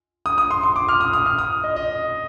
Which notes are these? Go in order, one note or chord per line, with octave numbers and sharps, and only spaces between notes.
D#6
D#6
C6
C6
D6
F6
D#6
D#6
F6
D#6
D#5
D#5